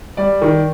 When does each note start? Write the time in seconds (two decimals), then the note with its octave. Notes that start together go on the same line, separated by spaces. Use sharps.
0.17 G3 D5
0.42 D#3